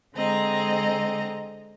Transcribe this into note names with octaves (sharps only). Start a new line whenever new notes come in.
D3 G#3 C4 D#5 A#5